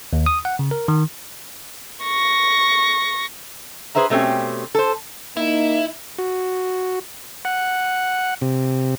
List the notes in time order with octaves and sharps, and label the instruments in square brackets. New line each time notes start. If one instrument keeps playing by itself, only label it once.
[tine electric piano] D#2
D#6
F#5
C#3
A#4
D#3
[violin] C#6 A#6
[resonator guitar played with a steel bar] G#4 B4 C5 E5 A#5
B2 A3 C4 C#4 G4
A4 C5
[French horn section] A#3 D#4 [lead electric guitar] E4
[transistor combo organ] F#4
F#5
C3